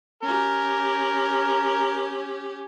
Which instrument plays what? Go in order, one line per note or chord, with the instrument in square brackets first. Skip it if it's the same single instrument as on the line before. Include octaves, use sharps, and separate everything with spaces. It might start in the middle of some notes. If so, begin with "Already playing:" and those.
[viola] C#4 G4 [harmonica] A#4